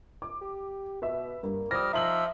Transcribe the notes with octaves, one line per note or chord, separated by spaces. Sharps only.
D6
G4
B2 B4 E5
G2 A#3
F3 G3 D#6 F6 A#6
F3 D#4 E5 A#5 E6 C7 F#7